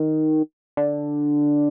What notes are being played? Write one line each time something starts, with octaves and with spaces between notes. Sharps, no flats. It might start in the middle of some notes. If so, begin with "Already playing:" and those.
Already playing: D#3
D3